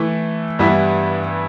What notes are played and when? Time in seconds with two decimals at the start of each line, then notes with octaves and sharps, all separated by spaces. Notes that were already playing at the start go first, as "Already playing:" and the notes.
Already playing: E3 A3 E4
0.59 G2 E3 G3 B3 E4